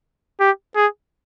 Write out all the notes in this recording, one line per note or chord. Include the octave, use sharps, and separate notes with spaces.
G4
G#4